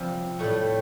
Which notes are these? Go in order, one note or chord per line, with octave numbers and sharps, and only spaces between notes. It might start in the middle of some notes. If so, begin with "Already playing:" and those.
Already playing: C3 F3 G3
A2 G3 A3